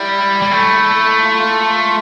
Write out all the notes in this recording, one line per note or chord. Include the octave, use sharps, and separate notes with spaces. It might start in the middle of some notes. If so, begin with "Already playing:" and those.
Already playing: G3 E4
G3
A3
F4
E4
F4